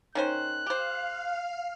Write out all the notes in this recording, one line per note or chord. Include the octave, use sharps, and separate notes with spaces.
D#3 C#4 C5 F#6
G4 C5 F5